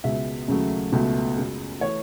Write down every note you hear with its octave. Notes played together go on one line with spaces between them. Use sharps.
C#2 B2 G#3 E5
D#2 C#3 F#3 A3
C#2 B2 A3
F#2 C#3 G#3
E3 A3 C#5